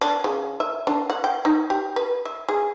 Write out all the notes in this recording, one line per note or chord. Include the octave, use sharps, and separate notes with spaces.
D4
C#3
E5
D4
F#5
G5
D#4
G4
B4
E5
G#4